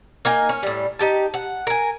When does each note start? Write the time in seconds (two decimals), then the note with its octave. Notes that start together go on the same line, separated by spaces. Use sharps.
0.25 A#3 D#4 G#5
0.49 C#4
0.63 A2 G3
0.99 D#4 G4 A5
1.34 F#5
1.67 A#4 G#5